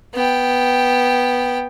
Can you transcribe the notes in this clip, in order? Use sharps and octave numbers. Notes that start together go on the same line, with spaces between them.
B3 G5